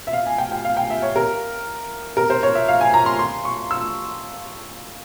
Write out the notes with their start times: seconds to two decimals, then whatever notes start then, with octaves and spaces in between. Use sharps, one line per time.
0.07 E5
0.13 F5
0.26 G#5
0.38 G5
0.52 G5
0.65 F5
0.77 G5
0.90 E5
1.02 C#5
1.16 A#4
2.17 A#4
2.30 C5
2.43 C#5
2.55 E5
2.68 F5
2.81 G#5
2.94 A#5
3.06 C6
3.19 C6
3.45 C#6
3.71 E6